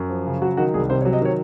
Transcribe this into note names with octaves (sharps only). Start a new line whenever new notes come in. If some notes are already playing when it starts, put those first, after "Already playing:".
Already playing: F#2
F3
C#3
F#3 F#4
D#3 F#4
C2 G#4
C3 C5
C#5
F#3
D#5
D#3 C#5